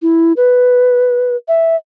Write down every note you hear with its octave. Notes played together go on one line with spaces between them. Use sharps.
E4
B4
E5